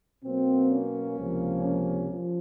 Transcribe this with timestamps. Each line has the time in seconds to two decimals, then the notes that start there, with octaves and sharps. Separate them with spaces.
0.23 B2 F#3 A#3 C4
0.70 C#4
1.16 C#2 C3 F3 A#3
1.63 C#4
2.10 F3